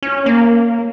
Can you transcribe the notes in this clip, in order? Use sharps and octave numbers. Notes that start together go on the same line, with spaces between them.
C#4
A#3